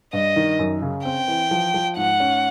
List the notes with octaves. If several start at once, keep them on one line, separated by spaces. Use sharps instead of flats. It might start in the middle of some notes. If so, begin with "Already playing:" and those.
G2 D#5
D#3
F#2
C#3
C4 G5
E3
F3
F3
G#2 F#5
C#4